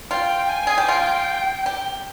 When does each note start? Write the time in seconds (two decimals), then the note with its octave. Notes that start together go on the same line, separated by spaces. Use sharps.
0.11 F4 G5
0.49 G#5
0.67 G#4
0.78 G4
0.88 F4 G5
1.66 G4